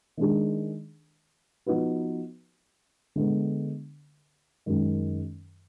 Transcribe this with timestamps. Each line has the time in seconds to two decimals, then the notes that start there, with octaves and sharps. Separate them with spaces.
0.17 D#3 G#3 D4 G#4
1.66 F3 B3 D#4 F#4 B4
3.16 D3 G#3 B3
4.66 F#2 D#3 G#3